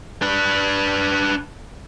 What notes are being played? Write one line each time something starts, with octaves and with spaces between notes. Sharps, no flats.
D4 B4